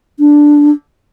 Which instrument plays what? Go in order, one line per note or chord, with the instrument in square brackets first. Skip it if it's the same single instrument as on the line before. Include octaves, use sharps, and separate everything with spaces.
[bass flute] D4